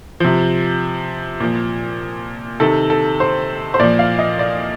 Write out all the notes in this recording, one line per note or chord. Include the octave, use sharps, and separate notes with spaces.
C3 F3
A#2 F3
C3 D#3 A4
A4
C5
C5
A#2 F3 D5
F5
D#5
D5